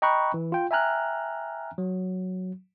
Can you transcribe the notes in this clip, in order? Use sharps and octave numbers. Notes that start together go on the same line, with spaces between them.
D#5 G5 A#5 B5 C#6 F#6
E3
F4 G5
E5 G5 G#5 A#5 F6 F#6
F#3